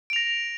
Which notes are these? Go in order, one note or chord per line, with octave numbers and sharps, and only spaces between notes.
A#6 D7 F7